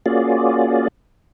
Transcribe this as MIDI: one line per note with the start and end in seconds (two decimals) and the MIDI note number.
0.06 0.88 58
0.06 0.88 61
0.06 0.88 65
0.06 0.88 66
0.06 0.88 68
0.06 0.88 74